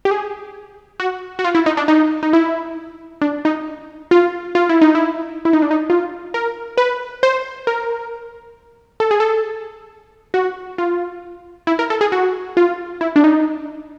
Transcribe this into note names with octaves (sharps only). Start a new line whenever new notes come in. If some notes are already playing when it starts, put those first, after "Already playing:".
G4
G#4
F#4
F#4
F4
E4
D#4
D4
D#4
D#4
E4
D4
D#4
F4
F4
E4
D#4
E4
E4
D#4
D4
D#4
F4
A#4
B4
C5
A#4
A4
G#4
A4
F#4
F4
E4
A#4
A4
G#4
F#4
F4
E4
D4
D#4